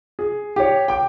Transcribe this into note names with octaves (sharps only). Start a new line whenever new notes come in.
G#4
G4 C#5
G5 D6